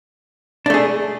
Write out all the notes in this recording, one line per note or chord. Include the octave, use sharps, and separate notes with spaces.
A3 D4 G#4